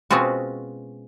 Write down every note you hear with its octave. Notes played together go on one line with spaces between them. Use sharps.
B2 G#3 C4 C#4 F4 F#4